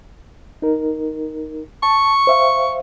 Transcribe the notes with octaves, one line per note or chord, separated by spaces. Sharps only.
D#4 A#4
A5 C#6
C5 E5 F5